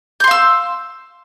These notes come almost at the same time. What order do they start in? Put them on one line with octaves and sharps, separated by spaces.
G6 C6 F5 E6